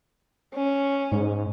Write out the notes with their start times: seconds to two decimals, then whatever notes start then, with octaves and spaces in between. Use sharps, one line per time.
0.55 C#4
1.12 G#2